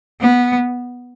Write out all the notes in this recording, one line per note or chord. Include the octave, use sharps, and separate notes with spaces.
B3